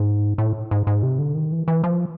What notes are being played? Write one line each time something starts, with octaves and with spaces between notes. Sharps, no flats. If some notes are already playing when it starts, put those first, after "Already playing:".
Already playing: G#2
A2
G#2
G#2
C3
D3
D#3
E3
E3
F3